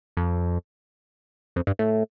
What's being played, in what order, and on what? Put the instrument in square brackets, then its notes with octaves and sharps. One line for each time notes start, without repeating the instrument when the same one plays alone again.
[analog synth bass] F2
F2
G2
A2